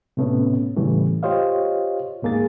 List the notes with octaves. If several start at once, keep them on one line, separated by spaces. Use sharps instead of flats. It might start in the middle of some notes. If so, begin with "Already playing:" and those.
A2 C3 A3 B3 C#4
A2 C#3 E3 G3 A3
F4 G4 C5 C#5 D#5 F5
D2 G#2 A#3 G#4 A6